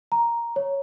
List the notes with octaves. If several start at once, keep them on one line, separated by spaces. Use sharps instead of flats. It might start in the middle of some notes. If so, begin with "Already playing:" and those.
A#5
C#5